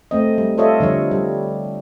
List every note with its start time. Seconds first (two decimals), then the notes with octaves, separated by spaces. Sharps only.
0.11 A3 C4 D#5
0.38 G3
0.58 F4 A4 C#5 D#5 E5
0.80 D3 F3 G3 C#5
1.11 G3